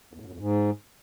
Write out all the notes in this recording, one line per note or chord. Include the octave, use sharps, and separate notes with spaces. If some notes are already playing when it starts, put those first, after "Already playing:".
E2
A2
F#2
F2
G#2